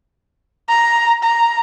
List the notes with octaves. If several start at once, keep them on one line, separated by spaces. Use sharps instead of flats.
A#5
A#5